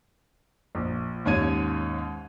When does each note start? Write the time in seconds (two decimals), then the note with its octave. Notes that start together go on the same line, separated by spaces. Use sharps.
0.75 A#1
1.25 D#2 G#2 C#4 C#5 G#6 D#7